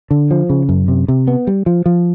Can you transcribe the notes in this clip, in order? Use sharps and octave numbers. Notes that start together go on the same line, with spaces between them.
D3
F3
C#3
F#2
C3
C3
B3
G3
F3
F3